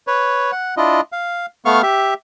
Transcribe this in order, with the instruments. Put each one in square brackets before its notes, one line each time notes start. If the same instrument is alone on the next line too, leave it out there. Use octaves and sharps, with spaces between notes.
[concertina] B4 C#5
F#5
D4 E4 F4 D#5
F5
A3 B3 F5 C#6 F6
G4 E5